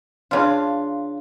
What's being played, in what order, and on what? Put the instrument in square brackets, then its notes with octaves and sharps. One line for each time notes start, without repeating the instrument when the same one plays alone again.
[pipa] C#3 F4 [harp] D4 A5 C6